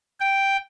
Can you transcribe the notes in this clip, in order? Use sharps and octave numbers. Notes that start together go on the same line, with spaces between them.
G5